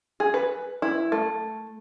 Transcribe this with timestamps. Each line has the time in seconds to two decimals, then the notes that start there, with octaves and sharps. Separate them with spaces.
0.20 G#4
0.34 B4
0.82 E4
1.12 A3